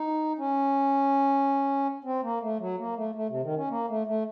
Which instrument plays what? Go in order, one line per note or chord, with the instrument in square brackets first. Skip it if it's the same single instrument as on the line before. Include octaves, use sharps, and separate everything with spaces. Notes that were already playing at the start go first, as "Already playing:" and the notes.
Already playing: [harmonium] D#4
C#4
C4
A#3
A3
F#3
A#3
A3
A3
C3
D#3
C#4
A#3
A3
A3